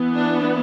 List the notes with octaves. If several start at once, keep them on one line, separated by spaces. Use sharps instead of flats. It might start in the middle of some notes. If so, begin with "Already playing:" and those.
Already playing: E3 B3
D4